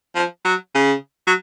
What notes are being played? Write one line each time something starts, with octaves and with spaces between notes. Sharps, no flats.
F3
F#3
C#3
F#3